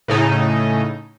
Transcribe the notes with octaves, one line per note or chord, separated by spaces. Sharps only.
A2 C#3 D#4